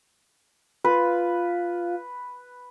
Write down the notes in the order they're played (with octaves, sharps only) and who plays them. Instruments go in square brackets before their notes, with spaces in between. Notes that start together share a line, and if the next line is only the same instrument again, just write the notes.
[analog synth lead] F4 [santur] B4